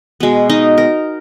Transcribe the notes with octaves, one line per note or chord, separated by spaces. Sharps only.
B2 G#3 B3
D#4
A#4